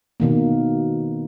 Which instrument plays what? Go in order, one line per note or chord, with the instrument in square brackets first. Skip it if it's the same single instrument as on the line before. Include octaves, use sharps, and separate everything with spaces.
[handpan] B2 D#3 A#3